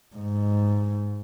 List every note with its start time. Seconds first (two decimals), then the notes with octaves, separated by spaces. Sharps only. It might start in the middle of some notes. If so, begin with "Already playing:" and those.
0.16 G#2